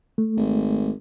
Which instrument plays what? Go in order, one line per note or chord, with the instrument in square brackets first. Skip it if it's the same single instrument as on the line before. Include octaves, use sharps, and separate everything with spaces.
[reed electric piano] A3
[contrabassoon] G#1